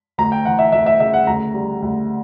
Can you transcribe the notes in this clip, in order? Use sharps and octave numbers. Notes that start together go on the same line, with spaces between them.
D2 A#5
G5
E3 F#5
E5
D2 E5
E5
C#3 E5
F#5
D2 A#5
G3
D2